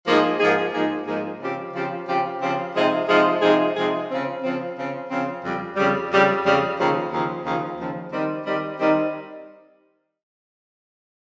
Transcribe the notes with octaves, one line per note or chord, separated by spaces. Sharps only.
G#2 F3 A#3 D#4 G#4
G#2 F3 A#3 D#4 G#4
G#2 F3 A#3 D#4 G#4
G#2 F3 A#3 D#4 G#4
C#3 F3 C4 G4
C#3 F3 C4 G4
C#3 F3 C4 G4
C#3 F3 C4 G4
C3 F3 G#3 D#4 G#4
C3 F3 G#3 D#4 G#4
C3 F3 G#3 D#4 G#4
C3 F3 G#3 D#4 G#4
C#3 F3 C4
C#3 F3 C4
C#3 F3 C4
C#3 F3 C4
F2 C#3 G3
F2 C#3 G3
F2 C#3 G3
F2 C#3 G3
D#2 C#3 F3
D#2 C#3 F3
D#2 C#3 F3
D#2 C#3 F3
D#3 G3 C4 D#4 G4
D#3 G3 C4 D#4 G4
D#3 G3 C4 D#4 G4